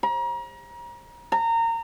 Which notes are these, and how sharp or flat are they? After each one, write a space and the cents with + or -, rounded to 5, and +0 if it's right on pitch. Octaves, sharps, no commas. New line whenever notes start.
A#5 +35
A#5 -25